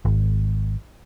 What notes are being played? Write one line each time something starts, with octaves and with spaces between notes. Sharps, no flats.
G#1